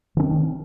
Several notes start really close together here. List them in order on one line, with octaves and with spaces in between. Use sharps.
D#3 C#4 C4